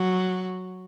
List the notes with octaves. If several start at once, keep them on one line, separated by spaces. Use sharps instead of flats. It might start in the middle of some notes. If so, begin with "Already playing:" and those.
Already playing: F#3